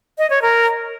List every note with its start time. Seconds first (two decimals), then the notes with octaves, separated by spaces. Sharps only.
0.18 D#5
0.30 C#5
0.42 A#4